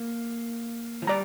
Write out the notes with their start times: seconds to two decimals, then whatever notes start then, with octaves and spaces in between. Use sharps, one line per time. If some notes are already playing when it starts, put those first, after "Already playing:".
Already playing: A#3
1.02 F3
1.07 G3 D5 A#5